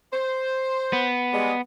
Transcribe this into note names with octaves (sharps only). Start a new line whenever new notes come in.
C5
B3
G3 G#3